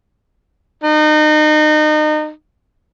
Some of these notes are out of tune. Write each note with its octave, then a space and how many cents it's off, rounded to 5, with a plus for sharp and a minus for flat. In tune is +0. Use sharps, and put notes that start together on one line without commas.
D#4 -30